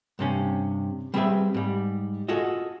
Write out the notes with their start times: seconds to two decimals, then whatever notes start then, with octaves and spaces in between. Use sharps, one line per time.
0.19 G2 C3 C#4
1.14 G3 C4 G#4 A4 B4 E5
1.54 G#2 G3
2.28 F4 F#4 G#4 A4 D#5